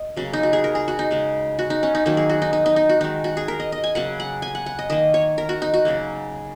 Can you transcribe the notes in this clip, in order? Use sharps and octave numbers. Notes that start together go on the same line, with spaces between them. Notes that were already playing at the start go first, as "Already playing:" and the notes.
Already playing: D#5
C#3 F#3 A#3
D#4
F#4
G#4
A#4
G#4
F#4
D#4
C#3 G#3
F#4
D#4
C#4
D#4
D#3 F#3 A#3 D#4
G#4
F#4
D#4
D#4
D#4
D#4
F#4
D#3 G#3 D#4
F#4
G#4
A#4
D#5
D#5
G#5
C#3 F#3 A#3 F#5
F#5
G#5
F#5
F#5
D#5
D#3 A#3 D#5
C#5
A#4
F#4
D#4
F#4
C#3 F#3 A#3